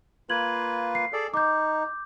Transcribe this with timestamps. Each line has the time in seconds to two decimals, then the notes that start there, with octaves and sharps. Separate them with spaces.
0.30 A#3 F4 B4 G#6 F#7
0.95 C7
1.13 G#4 A4 D5
1.34 D#4 D6 G6